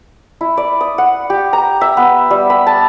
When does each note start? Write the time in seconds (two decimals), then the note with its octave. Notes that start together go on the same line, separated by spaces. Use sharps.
0.41 E4
0.57 D5
0.81 D#6
0.98 F#5
1.30 G4
1.53 A#5
1.81 E5
1.97 B3
2.30 G3
2.50 B5
2.67 A5